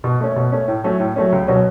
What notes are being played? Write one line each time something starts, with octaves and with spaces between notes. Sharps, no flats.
B2
A3 C#4
B2
A3 C#4
A2
F#3 A3 C#4
A2
F#3 A3 C#4
C#2
B2 F#3 C#4 F#4